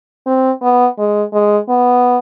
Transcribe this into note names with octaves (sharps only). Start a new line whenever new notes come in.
C4
B3
G#3
G#3
B3